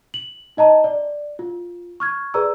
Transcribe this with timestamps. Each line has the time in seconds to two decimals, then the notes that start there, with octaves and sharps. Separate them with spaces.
0.14 F#7
0.57 D#4 D#5 A5 A#5
0.84 D5
1.39 F4
2.00 C#6 F6 G#6
2.34 G#4 B4 D5 A#5 E6